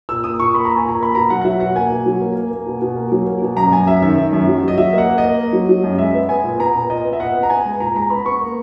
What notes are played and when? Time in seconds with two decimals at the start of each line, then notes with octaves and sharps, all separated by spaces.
0.09 A#2 E6
0.24 A#3 D#6
0.39 A#2 C#6
0.55 A#3 B5
0.65 A#3 A#5
0.77 G#5
0.85 A#2 A#5
1.00 A#3 B5
1.15 B2 A#5
1.30 F#3 F#5
1.41 F#5
1.45 F#3 E5
1.60 B2 F#5
1.75 A#3 G#5
1.90 B2
2.06 F#3
2.21 A#3
2.36 A#3
2.51 A#3
2.66 B2
2.82 B2
2.96 A#3
3.12 F#3
3.27 A#3
3.42 B2
3.57 F#2 A#5
3.71 F#2 G#5
3.86 F#2 E5
4.02 D#3 E5
4.18 D#3
4.33 F#2
4.47 F#3
4.63 F#3
4.68 D#5
4.78 F#3 E5
4.93 A#3
4.98 F#5
5.08 A#3
5.18 D#5
5.24 A#3
5.38 A#3
5.53 F#3
5.69 F#3
5.84 F#2
5.98 G#3 E5
6.14 B3
6.29 B3 G#5
6.44 A#2
6.59 B3 A#5
6.74 A#2
6.89 A#2 D#5
7.05 B3
7.13 E5
7.20 A#2 F#5
7.35 B3
7.43 A#5
7.50 B3 G#5
7.65 G#3
7.80 A#2 A#5
7.95 G#3 A#5
8.10 B3 B5
8.26 B3 C#6
8.41 A#3